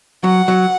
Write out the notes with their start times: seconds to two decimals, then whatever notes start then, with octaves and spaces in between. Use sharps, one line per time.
0.24 F#3 F#5
0.48 F#3